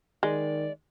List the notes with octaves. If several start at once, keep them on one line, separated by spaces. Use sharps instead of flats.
D#3 G#3 D5